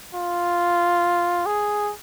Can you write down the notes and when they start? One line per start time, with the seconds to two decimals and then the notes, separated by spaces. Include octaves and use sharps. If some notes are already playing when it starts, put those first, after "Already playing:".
0.15 F4
1.46 G#4